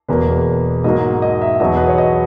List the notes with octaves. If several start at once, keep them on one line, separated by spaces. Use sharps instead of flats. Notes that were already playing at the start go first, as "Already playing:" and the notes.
E1 E2 B2 A#3 B4
G#2 F#3 A#3 D#5
D#5
E5
E2 B2 F#3 B3 D#5
B4
C#5
D#5